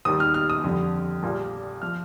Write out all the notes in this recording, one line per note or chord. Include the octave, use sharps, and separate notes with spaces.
D#2 D#3 G3 D#6
F6
F6
D#6
F2 D3 G3
A#1 A#2 G3
F3 F6